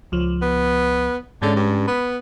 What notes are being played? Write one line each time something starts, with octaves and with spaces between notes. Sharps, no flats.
C#2 F3
B3
G#2 D3 G#3 C#4
G2
B3 B5